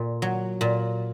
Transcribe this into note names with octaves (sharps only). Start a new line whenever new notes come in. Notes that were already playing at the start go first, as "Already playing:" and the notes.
Already playing: A#2
F#3
A#2